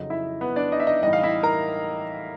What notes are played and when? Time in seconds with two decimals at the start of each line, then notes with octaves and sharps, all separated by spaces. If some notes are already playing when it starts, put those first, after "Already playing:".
Already playing: F2 C#3 F#3 D#4 D#5
0.10 E4 E5
0.41 B3 B4
0.56 D4 D5
0.72 D#4 D#5
0.80 E5
0.87 D#4 D#5
1.03 A2 E3 G3 D#4 D#5
1.13 F5
1.23 E4 E5
1.43 A#4 A#5